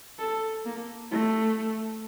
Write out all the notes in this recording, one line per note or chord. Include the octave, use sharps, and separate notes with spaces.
A4
A#3
A3